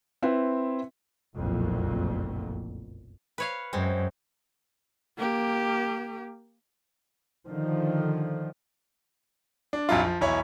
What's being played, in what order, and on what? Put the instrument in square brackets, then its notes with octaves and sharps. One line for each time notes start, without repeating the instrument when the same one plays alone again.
[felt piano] C4 E4 B4
[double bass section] F#1 B1 F2 A#2 A3
[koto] B4 C#5 F5
[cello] F#2 [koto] G#3 C4
[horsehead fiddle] A#3 G4
[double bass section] D3 D#3 F3
[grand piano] D4
A#1 F2 F#3 E4 F4
F3
B1 E2 E4 C#5 B5